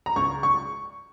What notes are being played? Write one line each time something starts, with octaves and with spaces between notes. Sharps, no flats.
A#5
C#2 C#6
C#6